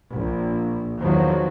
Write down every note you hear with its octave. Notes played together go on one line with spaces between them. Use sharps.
A#1
E2 D#3 F3 F#3